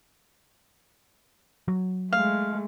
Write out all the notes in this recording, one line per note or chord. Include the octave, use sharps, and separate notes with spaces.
F#3
G#3 A3 F5